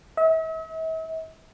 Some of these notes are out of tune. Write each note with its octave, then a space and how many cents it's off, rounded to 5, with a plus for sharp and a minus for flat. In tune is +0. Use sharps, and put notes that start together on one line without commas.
E5 -45